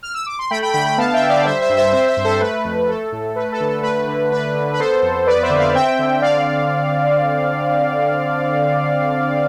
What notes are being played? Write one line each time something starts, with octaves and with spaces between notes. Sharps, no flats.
F6
E6
D6
C6
A3 G5 B5
G5 B5
D3 G5 B5
G5 B5
B3 F5 A5
E5 G5
D3
D5 F5
G3 C5 E5
C5 E5
G2
C5 E5
C4 C5 E5
C5 E5
G2
A4 C5
A3 B4
F2
A3 A4
A2
A3 B4
A4
D3
A4
A3 B4
D3
D4 B4
D3
B4
B3 A4 C5
F2
B3 B4 D5
C5 E5
D3
D5 F5
C4 E5 G5
D3
C4 D5 F5